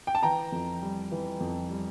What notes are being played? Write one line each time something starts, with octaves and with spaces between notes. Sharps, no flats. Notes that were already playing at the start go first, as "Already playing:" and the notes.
G5
A5
E3 G5 A#5
F2
G3
E3
F2
G3